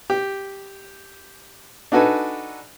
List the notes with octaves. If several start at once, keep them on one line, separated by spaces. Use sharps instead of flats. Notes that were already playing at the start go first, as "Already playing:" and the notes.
G4
D4 D#4 F#4 A4 B4 G#5